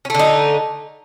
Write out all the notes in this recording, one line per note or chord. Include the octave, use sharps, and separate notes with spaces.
D3 A3 C#4 D#4